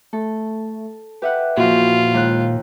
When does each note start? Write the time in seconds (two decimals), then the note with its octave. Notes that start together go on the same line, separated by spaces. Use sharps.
0.13 A3 A4
1.22 G4 B4 E5 F#5
1.57 E2 A#2 F3 F4 F#4
2.14 D#2 G#3 F#6